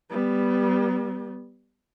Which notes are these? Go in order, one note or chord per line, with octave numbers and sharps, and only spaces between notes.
G3 B3